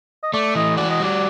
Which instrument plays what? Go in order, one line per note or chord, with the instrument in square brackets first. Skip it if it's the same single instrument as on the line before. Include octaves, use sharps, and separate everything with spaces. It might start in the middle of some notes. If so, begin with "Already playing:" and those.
[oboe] D#5
[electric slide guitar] A3 [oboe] D5
[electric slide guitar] E3 [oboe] D#5
[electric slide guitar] F#4 [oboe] D5
[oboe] D#5
[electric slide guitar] G3 [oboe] D5